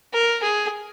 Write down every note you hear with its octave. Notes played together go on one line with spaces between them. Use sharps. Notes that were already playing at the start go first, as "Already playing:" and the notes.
A#4
G#4